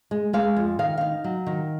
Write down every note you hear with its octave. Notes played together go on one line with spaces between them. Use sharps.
G#3
G#3 F5
F2
D#3 F5
D#4 F5
F#3
D#3